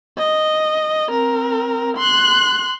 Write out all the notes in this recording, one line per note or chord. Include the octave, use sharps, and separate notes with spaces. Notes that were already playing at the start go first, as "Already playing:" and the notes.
D#5
C4 A#4
C6 F#6